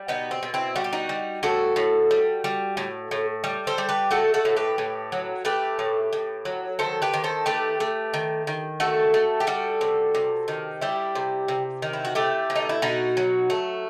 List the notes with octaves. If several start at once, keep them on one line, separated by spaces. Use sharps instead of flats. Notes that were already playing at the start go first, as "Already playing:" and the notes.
Already playing: G3
B2 B3 D#4
C4
B2
C4 E4
G3 F#4
G4
D#4 F#4
G3
A2 F#4 A4
A2
G3
G3
A2
A2
G3
A4 C5
G3
G4 B4
A3 F#4 A4
F#4 A4
A2
G4 B4
A2
F#3
A3 G4 B4
A2
A2
F#3
D#3 A4 C5
G4 B4
D#3
A4 C5
A3 G4 B4
A3
D#3
D#3
A3 F#4 A4
A3
G4
G3 F#4 A4
C3
C3
D#3
G3 E4 G4
C3
C3
D#3
E4
F#4
A3 E4 G4
B2
D#4
E4
B2 D#4 F#4
F#3
A3